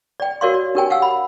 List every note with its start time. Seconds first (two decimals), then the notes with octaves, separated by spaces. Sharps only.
0.20 D5 G5
0.41 F#4 A#4 C#5 D5 F5 C6
0.54 D5
0.75 D4 G4 A#4 C#5 G5 G#5
0.90 F5 F#5 G#5 E6
1.02 B5